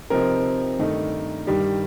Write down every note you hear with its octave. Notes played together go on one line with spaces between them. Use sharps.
C3 F3 C4 D#4 A#4
G2 D#3 A3 D#4
G2 D#3 G3